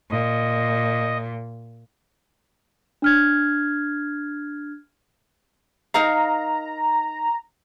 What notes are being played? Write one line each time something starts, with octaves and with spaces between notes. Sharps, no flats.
A#2 D#5
D4 F6 G#6
D#4 A#4 F5 A#5